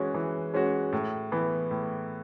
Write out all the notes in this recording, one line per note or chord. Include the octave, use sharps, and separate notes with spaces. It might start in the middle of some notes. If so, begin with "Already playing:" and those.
Already playing: E3 G#3 C#4 F#4
E3
G#3 C#4 F#4
A2
E3 B3
A2